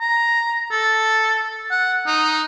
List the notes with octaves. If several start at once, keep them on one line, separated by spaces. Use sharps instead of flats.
A#5
A4
F#5
D#4